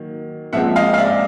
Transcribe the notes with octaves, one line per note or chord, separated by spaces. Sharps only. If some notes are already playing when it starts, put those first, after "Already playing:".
Already playing: D#3 F#3 A#3
A#2 F3 G#3 C4 E5 F#5
D#5 F5
F5
D5 E5